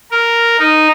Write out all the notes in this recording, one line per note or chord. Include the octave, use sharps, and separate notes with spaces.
A#4
D#4